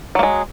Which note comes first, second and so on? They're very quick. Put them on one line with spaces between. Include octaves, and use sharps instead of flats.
F#3 A#3 G#3